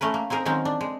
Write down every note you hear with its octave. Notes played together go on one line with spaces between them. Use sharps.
A3 C#4 A#4 B4
A#3
C4 D#4 G#4 A#4
D#3 F#3 G#3 C4 C#4 D#4
D4
G#3